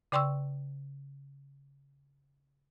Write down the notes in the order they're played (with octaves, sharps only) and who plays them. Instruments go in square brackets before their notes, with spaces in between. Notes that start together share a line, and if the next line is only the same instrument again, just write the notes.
[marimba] C#3 D5 G5 C6 C#6 E6